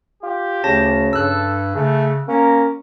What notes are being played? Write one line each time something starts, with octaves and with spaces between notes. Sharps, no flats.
F4 G4
D2 C#3 A5 A#6
G2 A4 E6 F#6
C#3 A3 G#4
A#3 C#4 A#4